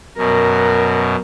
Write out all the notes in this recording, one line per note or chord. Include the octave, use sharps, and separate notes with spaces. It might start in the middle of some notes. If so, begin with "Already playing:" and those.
F#2 B2 A#4